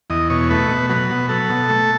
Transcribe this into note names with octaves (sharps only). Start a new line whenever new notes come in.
E2 D#5
B2 C#5
A3 B4
B2
F#3 B4
B2
F#3 A4
B2
A3